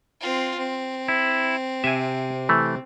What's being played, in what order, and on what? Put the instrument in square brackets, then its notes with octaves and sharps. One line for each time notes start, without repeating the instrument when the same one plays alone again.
[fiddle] C4 F4
C4
[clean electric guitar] E4
[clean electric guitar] C3 [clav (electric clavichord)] E5 G#5
[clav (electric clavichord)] E3 A3